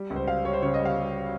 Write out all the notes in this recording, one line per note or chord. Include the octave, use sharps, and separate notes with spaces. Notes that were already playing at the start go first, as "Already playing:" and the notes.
Already playing: G3
C#2
C5
G3 F5
G3 C#5
C5
C#3 C#5
D#5
G3
F5
G3